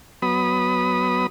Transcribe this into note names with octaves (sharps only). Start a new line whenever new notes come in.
F#3 B3 B5 D#6